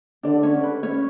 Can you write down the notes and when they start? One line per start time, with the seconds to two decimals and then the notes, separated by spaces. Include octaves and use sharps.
0.23 D3 D4 D5
0.43 C#4 C#5
0.63 B4
0.83 C#4 C#5